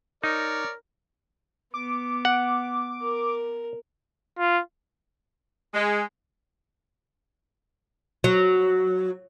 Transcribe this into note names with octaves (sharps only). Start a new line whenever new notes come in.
D#4 A#4 C#5 D5
B3 D6
F#5
A#4
F4
G#3
F#3